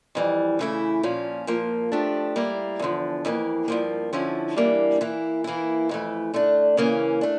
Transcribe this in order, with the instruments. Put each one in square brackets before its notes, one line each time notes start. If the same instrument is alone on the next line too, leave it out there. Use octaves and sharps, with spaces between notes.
[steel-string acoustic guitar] F2 E3 G3
C#3 E3 A3 E4
A#2 F3 C#4
A#2 F3 A#3
F3 A3 D4 G4
G3 A#3 E4 A#4
E2 D3 F3
F2 E3 G3 A#3
G2 F3 A#3
D3 F3 C#4 E4
E3 G3 A#3 D4
E3 A#3 E4
E3 A#3 E4
F2 E3 A3
D3 A3 D4
C#3 E3 A#3 C#4
A3 D4